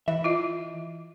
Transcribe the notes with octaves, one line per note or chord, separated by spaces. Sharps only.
E3 E5
E4 F4 D#5